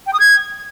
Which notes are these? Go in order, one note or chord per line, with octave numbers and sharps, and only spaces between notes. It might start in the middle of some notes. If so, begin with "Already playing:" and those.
G5
D#6
G#6